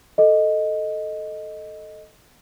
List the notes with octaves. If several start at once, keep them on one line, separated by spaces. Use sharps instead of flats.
A4 D#5